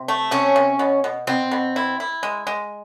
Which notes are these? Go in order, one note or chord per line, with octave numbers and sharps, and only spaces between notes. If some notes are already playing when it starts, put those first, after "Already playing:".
Already playing: C3
A3
C3 C#4
C3
B2
B2
B2 C4
B2
E4
E4
G#3
G#3